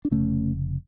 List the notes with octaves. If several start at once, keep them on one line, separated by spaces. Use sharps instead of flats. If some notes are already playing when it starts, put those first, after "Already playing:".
D4
F1 F2 C#3 A3 C#4